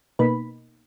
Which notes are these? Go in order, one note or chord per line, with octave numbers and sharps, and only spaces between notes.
B2 A#3 D#4 B4 B5